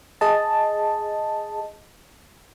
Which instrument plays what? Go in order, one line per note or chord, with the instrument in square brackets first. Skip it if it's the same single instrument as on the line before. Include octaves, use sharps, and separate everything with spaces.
[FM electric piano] G#4 D#5 A5